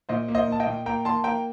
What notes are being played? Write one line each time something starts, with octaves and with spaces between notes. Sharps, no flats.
A#2 C5 D#5
A#3
C5 D#5
A#2 A5
D#5 G5
A#2
A#3 G5 A#5
A#3 A5 C6
A#3 G5 A#5